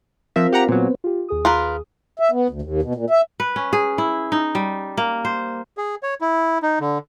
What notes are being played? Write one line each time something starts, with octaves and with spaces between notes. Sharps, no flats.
F3 C4 F4 A#4 E5
G4 F#5 A#5
A#2 F#3 B3 C4
F4 G4
D#2 G#4 D#6
F4 A#4 B4
E5
B3
D2
D#2
B2
A#2
E5
B4
C#4
G#4
E4
D#4
G3
A#3
C5
G#4
C#5
E4
D#4
D3